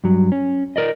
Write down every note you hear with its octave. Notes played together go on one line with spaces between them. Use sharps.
G2 F#3
C#4
A#4 D5 D#5